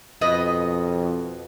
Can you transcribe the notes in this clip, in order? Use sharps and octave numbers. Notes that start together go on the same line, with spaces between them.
F2 B2 B4 D#5